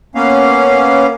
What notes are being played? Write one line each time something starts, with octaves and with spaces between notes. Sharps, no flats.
A#3 B3 C#4 F5